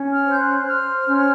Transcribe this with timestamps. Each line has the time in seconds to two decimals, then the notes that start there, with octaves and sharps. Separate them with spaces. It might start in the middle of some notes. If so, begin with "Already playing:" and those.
Already playing: C#4
0.12 F6
0.25 C5
0.30 G6
0.39 F#6
0.66 C5 F6
1.07 C#4